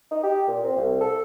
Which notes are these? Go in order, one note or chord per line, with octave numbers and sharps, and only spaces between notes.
D#4
G4
A#2
C4
C2
A4